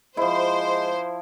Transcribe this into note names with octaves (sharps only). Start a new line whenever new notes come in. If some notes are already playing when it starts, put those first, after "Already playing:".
F3 G#3 E4 C5